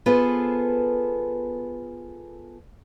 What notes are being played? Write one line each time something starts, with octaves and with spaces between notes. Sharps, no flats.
B3 F4 G#4 A4 B4 C5